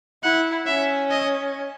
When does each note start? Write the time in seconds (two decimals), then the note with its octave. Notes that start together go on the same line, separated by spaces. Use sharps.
0.23 E4 F#5
0.66 C#4 E5
1.11 D#5